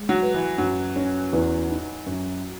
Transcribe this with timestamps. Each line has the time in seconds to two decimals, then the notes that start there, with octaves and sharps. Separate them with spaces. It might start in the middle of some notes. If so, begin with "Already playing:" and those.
Already playing: G#3
0.09 F#3
0.22 B4
0.34 E3
0.58 F#2 F#3
0.96 C#4
1.33 E2
1.70 D#4
2.06 F#2